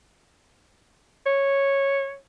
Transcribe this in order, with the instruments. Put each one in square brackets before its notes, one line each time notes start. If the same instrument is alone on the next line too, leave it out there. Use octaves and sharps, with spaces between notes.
[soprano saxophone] C#5